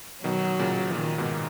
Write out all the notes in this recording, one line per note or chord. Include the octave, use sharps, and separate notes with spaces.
B2 D#3 F#3
A#2 C#3
A#2 D#3
G#2 B2